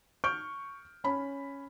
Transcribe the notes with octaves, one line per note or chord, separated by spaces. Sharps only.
C#6 F6 G6 D7
C#4 B5